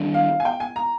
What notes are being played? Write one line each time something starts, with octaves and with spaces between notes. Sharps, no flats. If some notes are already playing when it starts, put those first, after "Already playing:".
Already playing: D#3 G3 D4
F5
G#5
G5
G#5
A#5